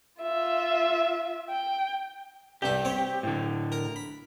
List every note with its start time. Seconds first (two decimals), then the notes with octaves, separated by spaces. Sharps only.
0.22 F4 E5
1.50 G5
2.62 C2 G2 G4 E5
2.85 C4 C#5
3.23 A2 D3
3.72 A#4
3.96 B5